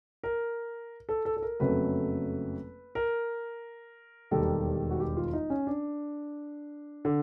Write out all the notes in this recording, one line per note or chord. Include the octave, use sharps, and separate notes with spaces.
A#4
A4
A4
A4
A#4
F#1 F2 C#3 F#3 A3 B4
A#4
E1 D#2 D#3 G3 A#3 A4
F#4
G4
F4
D#4
C#4
D4
D3